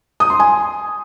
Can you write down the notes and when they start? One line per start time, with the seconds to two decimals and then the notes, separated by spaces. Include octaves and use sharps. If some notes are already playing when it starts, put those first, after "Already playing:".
0.20 D#6
0.30 C6
0.40 G#5